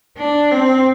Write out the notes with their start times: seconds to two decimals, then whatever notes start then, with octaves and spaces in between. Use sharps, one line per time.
0.17 D4
0.51 C4